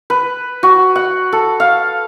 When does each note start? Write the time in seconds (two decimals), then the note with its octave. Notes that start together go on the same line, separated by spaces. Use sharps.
0.10 B4
0.63 F#4
0.96 F#5
1.33 A4
1.60 F5